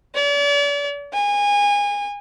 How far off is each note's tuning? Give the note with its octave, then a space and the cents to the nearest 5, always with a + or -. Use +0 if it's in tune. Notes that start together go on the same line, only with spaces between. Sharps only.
D5 -40
G#5 -25